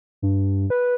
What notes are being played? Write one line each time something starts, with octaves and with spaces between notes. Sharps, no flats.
G2
B4